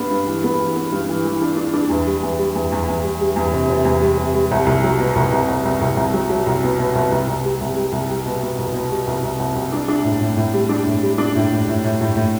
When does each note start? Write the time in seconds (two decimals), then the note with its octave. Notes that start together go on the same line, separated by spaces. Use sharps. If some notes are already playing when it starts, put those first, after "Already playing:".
Already playing: G2 B3 D4
0.10 G2
0.27 E3
0.44 B3
0.60 E3
0.76 B3
0.92 G2
1.09 E3
1.25 E3
1.42 D4
1.57 D4
1.73 D4
1.90 E2
2.07 G3
2.23 E2
2.39 G3
2.55 E2
2.72 E2
2.88 E2
3.03 G3
3.21 G3
3.36 E2
3.53 C3
3.70 C3
3.85 E2
4.01 G3
4.18 C3
4.34 G3
4.51 C2
4.66 C2
4.83 F#3
4.99 B2
5.15 C2
5.33 C2
5.48 C2
5.65 C2
5.81 C2
5.97 C2
6.14 F#3
6.29 F#3
6.46 C2
6.63 B2
6.79 B2
6.95 C2
7.12 C2
7.27 C2
7.44 G3
7.61 C2
7.76 G3
7.92 C2
8.10 G3
8.26 B2
8.42 B2
8.59 C2
8.74 B2
8.91 G3
9.07 C2
9.23 C2
9.39 C2
9.56 C2
9.73 D4
9.88 D4
10.04 A2
10.21 A2
10.37 A2
10.54 G3
10.69 D4
10.86 A2
11.03 G3
11.18 D4
11.35 A2
11.52 A2
11.68 A2
11.84 A2
12.01 A2
12.16 A2